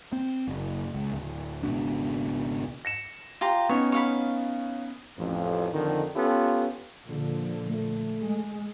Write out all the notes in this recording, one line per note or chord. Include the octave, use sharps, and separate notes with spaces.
C4
F#1
C#2
D1
G#1 C#2 B2 D4
A#6 C#7 E7
F4 G4 A#5
B3 C#4 D#4 C#5
C#5 F5 B5
A1 F2
F2 D3 D#3
B3 C#4 F4 G4 A4
A#2 D3 F3
A3
G#3